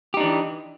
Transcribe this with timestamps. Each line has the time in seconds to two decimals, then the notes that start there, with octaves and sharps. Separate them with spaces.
0.14 G4
0.17 D#4
0.20 D4
0.23 E3